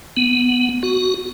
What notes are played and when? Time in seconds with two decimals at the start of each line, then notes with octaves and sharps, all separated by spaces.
0.17 B3
0.83 F#4